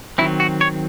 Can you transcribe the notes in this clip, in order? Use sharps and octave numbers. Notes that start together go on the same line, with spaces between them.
D#3 F#3 C4 E4
F#4
C#5